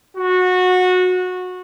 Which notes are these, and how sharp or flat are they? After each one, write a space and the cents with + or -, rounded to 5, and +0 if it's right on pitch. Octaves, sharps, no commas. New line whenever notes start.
F#4 -20